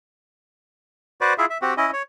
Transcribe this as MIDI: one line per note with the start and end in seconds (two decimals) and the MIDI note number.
1.21 1.33 66
1.21 1.33 71
1.21 1.33 72
1.21 1.33 74
1.38 1.46 64
1.38 1.46 65
1.38 1.46 68
1.38 1.46 76
1.50 1.58 76
1.62 1.74 60
1.62 1.74 66
1.62 1.74 67
1.77 1.91 61
1.77 1.91 64
1.77 1.91 75
1.93 2.02 73